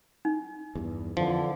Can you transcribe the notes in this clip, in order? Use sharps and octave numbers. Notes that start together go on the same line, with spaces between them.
D#4
E2 G2
F2 D3 E3 F3